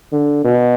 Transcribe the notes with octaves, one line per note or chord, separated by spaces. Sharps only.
D3
B2